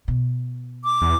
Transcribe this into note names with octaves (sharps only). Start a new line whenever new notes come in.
B2
D6
E2